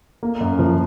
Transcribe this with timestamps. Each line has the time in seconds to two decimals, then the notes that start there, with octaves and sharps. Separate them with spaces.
0.23 A#3
0.41 F#2
0.59 F3